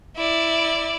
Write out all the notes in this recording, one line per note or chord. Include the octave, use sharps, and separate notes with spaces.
E4 D5